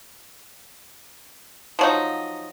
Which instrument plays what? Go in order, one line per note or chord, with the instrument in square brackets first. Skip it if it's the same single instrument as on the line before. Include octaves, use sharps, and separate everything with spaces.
[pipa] F3 F#3 D#4